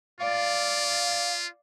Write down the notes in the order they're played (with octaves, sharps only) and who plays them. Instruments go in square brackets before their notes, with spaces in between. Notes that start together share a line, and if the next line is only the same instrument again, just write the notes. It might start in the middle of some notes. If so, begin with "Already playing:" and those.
[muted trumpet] F4 [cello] D5 [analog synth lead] F5